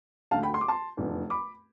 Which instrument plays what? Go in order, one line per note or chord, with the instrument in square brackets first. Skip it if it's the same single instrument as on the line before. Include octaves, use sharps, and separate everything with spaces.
[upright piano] D2 D3 A3 F5 A5
G5 B5
C6
D6
A5 C6
F1 E2 D3 F3 A3
B5 D6